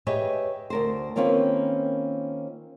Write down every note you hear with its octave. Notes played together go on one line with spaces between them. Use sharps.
G4 G#4 B4 C#5 D#5 E5
D2 A#4 C5
D#3 A#3 C4 C#4 F4 B4